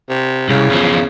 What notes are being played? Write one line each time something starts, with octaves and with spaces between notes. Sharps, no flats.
C3
C2 C#3
E2 F3